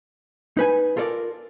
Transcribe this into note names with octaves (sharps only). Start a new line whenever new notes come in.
D#4 B4 G#5
F4 A4 A#4 D5